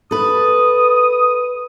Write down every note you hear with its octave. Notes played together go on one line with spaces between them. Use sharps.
A4 B4 D#6